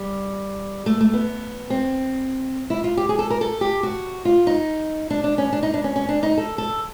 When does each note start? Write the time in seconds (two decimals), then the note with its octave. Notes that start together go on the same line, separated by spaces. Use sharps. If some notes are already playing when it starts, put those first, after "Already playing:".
Already playing: G3
0.86 A3
1.01 A3
1.13 B3
1.70 C4
2.70 E4
2.84 F4
2.97 G4
3.09 G#4
3.19 A4
3.30 A#4
3.41 A4
3.61 G4
3.83 F#4
4.25 F4
4.47 D#4
5.10 D4
5.24 D4
5.38 C#4
5.52 D4
5.63 D#4
5.74 D4
5.84 C#4
5.96 C#4
6.09 D4
6.23 D#4
6.37 A4
6.58 A4